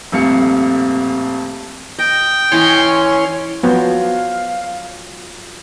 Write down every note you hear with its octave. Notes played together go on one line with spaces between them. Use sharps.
D#1 F2 A3 F5 C#7
D#5 G5
E3 C#4 E4 C#5 D#5 C6
F3 F#3 B3 F5